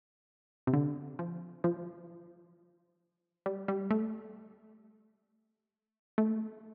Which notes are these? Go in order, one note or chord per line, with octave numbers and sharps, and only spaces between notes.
C3
D3
F3
F3
G3
G3
A3
A3